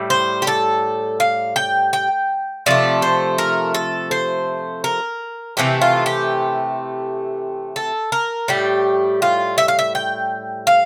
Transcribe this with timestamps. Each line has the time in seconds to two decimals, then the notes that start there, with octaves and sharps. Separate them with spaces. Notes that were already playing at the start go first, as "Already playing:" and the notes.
Already playing: A2 G3
0.10 C5
0.42 G4
0.47 A4
1.20 F5
1.56 G5
1.93 G5
2.66 C3 F3 A3 D5
3.02 C5
3.38 A#4
3.74 A4
4.11 C5
4.84 A#4
5.57 C3 E3 A3 G4
5.81 F4
6.06 G4
7.76 A4
8.12 A#4
8.48 A2 G3 G4
9.22 F4
9.58 E5
9.68 F5
9.79 E5
9.95 G5
10.67 F5